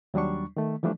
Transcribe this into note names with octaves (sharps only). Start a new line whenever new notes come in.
D#2 F#3 G3 D4 C#6
D#3 A3
E3 F3 G3 A3 D4